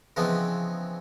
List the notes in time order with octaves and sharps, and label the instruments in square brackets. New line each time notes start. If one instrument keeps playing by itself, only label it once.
[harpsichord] C#3 E3 F3 G#3 B3 C4